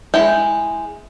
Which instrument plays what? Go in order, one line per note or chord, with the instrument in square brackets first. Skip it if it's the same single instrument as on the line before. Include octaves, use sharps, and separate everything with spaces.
[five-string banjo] G#3 E4 G5